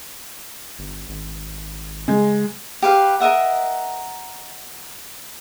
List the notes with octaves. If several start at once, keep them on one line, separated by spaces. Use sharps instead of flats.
G1
G#1
C#3 G#3
G4 B4 F5
A#4 D#5 E5 F#5